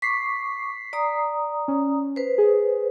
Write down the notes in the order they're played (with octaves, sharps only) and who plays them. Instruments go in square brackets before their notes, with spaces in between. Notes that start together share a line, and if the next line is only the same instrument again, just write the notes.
[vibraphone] C#6 D6 [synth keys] B6 C7
[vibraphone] D5 A#5 D#6
[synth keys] C#4
[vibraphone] B4 C5
[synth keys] G#4